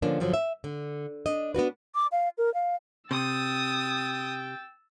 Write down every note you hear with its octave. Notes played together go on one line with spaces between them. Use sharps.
D3 F3 A#3 C#4 D4
G2 D3 F3 F#3
E5
D3
D4 D#5
B3 D4 F#4 B4
D6
F5
A#4
F5
C3 G5 D#6 E6 A6